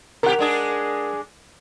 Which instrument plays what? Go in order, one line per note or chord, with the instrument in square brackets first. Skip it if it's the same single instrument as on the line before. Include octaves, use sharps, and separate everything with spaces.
[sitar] B2 F4 G4 [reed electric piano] A#4 F#5
[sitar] G#3 D4 G#4